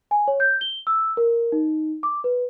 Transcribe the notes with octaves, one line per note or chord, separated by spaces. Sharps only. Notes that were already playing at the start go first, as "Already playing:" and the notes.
G#5
C#5
G6
G7
E6
A#4
D#4
D6
B4